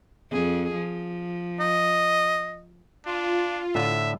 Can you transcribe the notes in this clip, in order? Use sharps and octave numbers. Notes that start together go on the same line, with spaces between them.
F2 G#4
F3
D#5
D4 F4
A2 D3 E5